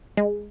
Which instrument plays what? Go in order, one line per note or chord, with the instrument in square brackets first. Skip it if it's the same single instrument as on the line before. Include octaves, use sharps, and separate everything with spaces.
[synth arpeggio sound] G#3